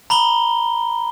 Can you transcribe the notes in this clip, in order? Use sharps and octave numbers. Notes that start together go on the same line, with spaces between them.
A#5 B5 G7